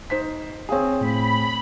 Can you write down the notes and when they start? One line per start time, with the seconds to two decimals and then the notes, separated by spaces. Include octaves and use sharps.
0.10 D#4 C5 B6
0.69 C4 G#4 C#5 F5 G#5
1.01 A2 A3 B5